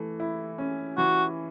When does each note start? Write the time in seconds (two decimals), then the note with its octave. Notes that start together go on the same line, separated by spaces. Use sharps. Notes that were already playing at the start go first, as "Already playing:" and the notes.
Already playing: E3 A3
0.20 E4
0.58 C#4
0.98 E3 F#4